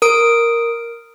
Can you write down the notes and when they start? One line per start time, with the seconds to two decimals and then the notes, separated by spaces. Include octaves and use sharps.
0.02 A#4 D#6 D7